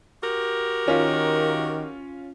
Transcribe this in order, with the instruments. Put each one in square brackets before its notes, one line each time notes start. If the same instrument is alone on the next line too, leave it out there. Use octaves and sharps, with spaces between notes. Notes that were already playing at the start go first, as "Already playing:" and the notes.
[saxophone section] F#4 G4 A#4
[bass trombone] D#3 [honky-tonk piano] C#4 F4